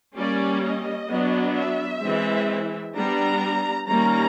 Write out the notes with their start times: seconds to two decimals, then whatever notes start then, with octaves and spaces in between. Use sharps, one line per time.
0.15 G3 A#3 C#4 D5
0.63 D#5
1.09 F#3 B3 D4
1.56 E5
2.02 E3 G#3 C4
2.95 G3 B3 D4 A#5
3.88 D#3 G3 A#3 C#4 A#5